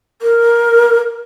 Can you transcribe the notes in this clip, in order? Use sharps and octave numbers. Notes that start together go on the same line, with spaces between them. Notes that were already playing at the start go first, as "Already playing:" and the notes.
A#4